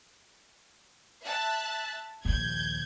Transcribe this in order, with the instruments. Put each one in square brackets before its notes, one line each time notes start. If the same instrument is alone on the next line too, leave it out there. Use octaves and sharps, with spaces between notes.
[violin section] E5 A5 F#6
[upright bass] A#1 D#2 [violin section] G6 G#6